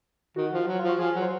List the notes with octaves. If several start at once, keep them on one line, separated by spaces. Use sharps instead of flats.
D#3 F#4
F3
F#3
F3 F4
F#4
F3 G#4
F#3
C5